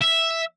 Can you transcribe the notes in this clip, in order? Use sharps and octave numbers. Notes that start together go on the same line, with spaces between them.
E5